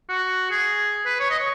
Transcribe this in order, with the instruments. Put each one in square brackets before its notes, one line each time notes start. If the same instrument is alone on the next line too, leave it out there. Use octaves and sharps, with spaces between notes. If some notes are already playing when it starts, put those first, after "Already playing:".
[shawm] F#4
G#4
B4
C#5
D#5
C#5